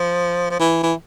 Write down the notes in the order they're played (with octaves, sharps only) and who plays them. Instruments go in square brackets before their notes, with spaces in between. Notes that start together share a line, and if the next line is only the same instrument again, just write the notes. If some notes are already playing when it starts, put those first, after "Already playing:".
Already playing: [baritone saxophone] F3
F3
E3
E3